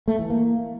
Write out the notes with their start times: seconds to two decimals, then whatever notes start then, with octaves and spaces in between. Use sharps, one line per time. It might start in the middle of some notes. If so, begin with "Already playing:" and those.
0.08 A3
0.19 E3
0.30 A#3